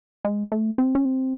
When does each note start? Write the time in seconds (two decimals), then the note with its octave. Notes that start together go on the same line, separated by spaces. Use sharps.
0.25 G#3
0.52 A3
0.78 C4
0.95 C#4
1.05 C4